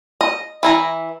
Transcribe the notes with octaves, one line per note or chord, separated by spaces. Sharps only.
D#5
E3 E4 A#5